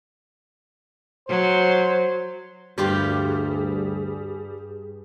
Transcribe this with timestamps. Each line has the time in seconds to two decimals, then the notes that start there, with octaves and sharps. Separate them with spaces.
1.29 F#3 C5
2.78 D2 G2 G3 F4 G4 G#4